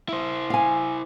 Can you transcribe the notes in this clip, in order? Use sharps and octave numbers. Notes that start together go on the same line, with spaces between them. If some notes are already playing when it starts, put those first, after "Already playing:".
E4 C5
F5 G#5